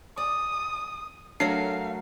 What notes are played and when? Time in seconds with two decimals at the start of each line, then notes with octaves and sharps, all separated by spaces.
0.17 D5 D#6
1.40 F#3 A3 D4 A#4 F5 C7